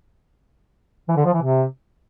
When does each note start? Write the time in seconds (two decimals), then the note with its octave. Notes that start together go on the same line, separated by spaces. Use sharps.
1.08 E3
1.17 D3
1.25 F3
1.33 E3
1.42 C3